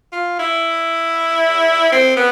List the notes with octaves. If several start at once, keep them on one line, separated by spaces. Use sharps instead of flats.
F4
E4
C4
B3